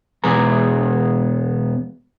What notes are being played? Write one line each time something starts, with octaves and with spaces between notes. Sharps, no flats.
E2 B2 G#3 B3 G#4 A#5